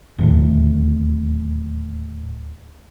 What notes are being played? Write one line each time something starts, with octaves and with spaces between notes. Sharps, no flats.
D1 D#2 A2